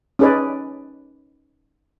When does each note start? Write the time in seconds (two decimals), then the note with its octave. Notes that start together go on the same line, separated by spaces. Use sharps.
0.19 C#4 D#4 G#4 B4 D5